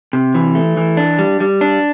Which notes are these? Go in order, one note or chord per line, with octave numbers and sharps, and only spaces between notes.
C3
E3
A3
E3
D4
G3
G3
D4